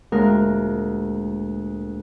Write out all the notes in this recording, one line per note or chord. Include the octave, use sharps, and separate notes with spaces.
D2 A#2 G#3 A#4